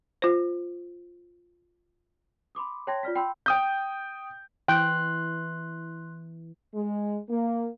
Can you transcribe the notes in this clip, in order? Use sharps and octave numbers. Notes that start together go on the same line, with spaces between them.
F4 C5
B5 C6 D6 D#6
C#5 G5 A5 C6 G#6 A#6
F4 D5 F6 B6
G5 B5 C6 E6 G6
G5 D#6 G6
E3 G5 C6 F#6
G#3
A#3